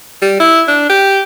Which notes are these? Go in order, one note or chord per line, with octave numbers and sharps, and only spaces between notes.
G3
E4
D4
G4